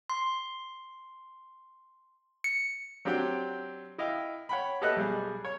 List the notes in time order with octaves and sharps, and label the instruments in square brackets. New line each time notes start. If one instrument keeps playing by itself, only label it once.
[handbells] C6
C#7
[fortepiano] F#3 C4 D4 G4 F#5 G5
E4 D#5 F5 G5
C#5 F#5 G5 B5
G4 A4 B4 D#5 E5 F#6
B1 G3 G#4
C#5